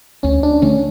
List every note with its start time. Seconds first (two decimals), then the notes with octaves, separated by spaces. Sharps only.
0.23 D2 C#4
0.43 D4
0.62 D3 A3 C#4